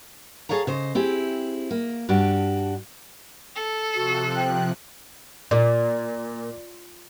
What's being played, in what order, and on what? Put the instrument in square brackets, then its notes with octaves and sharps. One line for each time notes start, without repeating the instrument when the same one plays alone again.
[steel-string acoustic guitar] G#4 A4 C#5 F5 A#5
C#3 C5 D#5
C4 E4 G4 G#4
A#3
G2 D4 F#4 G4
[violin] A4
[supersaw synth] C3 F3 F#6 [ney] F#4
[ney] G5
[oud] A#2 [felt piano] D5